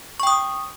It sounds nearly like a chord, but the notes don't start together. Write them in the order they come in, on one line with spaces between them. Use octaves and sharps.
C#6 G5 D#6